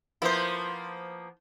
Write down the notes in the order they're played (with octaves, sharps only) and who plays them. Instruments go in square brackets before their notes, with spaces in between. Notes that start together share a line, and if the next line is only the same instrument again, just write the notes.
[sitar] F3 A#3 B3 [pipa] E4 C5